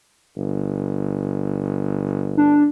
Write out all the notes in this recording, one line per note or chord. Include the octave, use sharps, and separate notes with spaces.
G1
D4